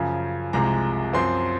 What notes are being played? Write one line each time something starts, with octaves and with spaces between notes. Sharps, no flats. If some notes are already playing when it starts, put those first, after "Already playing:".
Already playing: F#2 C#3 F3
C2 C3 F3 G#3 A#5
F#2 F3 C4 C6